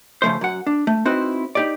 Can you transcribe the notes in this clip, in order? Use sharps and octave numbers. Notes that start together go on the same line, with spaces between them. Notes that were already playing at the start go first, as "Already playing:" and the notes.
C#3 F3 A3 C5
F#2 F#5
D4
A3
C4 D#4 E4 F#4 B4 C5
D#4 G4 D5